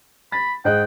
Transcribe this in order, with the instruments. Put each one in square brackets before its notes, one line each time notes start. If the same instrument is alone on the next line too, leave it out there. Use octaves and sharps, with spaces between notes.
[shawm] B5 [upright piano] A6
[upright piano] G#2 D#5 F#6 [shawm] G5